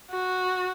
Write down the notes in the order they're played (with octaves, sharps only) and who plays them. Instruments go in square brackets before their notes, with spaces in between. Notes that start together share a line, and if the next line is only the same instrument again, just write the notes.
[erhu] F#4